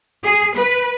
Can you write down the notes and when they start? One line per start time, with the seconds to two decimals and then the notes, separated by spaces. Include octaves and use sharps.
0.23 G#4
0.55 B4